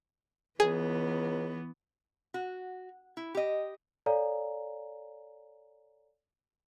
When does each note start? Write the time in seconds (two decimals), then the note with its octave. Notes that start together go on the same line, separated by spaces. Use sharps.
0.60 C#2 E3 B3 G#4
2.34 F#4
3.17 E4
3.35 G4 D#5
4.06 A4 C#5 D5 F5 G#5 A#5